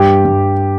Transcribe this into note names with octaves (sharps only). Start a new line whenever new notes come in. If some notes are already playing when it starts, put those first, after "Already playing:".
Already playing: G2 G4
G2